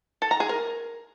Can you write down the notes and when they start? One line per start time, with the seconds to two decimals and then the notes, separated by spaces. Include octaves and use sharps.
0.22 A4
0.31 A#5
0.40 G#4
0.49 A#4